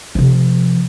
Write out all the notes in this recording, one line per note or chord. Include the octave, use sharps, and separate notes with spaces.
C3 F3